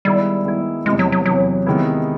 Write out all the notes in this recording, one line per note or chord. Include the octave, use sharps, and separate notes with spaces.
D#3 G3 G#3 B3 E4
D#3 G#3 B3 E4
E2 C3 E3 G#3
F#3
F#3
E2 C3 E3 F#3
C3 D#3 G#3 B3 E4